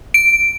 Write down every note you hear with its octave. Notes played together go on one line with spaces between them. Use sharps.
D7